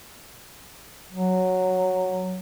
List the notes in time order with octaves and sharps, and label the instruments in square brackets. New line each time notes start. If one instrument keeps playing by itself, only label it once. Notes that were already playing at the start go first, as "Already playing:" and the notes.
[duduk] F#3